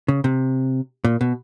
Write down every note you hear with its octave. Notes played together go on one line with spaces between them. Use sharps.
C#3
C3
A#2
B2